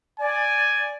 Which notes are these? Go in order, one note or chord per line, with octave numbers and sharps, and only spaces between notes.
D5 G#5